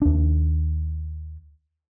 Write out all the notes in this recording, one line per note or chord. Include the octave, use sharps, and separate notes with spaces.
D#2 D4